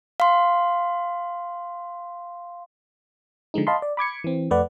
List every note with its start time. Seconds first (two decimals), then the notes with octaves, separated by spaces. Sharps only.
0.20 F5 C6
3.54 D3 F3 G#3 D#4
3.67 D#5 F5 A5 B5 C6
3.82 D5
3.97 B5 D6 G#6 C#7
4.24 E3 C4
4.51 F2 A3 B4 D5 F#5